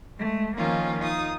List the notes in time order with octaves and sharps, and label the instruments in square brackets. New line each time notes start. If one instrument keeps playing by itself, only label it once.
[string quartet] G#3 A3
D#3 F3 A#3 C#4 D#4 F4
D#4 F4 D#6